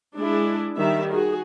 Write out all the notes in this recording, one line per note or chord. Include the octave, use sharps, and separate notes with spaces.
G#3 D4 E4 G#4
D#3 G3 E5
F#4 G#4